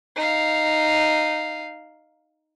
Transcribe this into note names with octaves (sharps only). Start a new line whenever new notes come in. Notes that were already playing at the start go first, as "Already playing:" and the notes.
D#4 F5